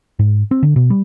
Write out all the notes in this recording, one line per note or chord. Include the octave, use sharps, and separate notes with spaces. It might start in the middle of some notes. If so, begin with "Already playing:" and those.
G#2
C4
D3
B2
G3